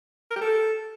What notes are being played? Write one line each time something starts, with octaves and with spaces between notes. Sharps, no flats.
A#4
G4
A4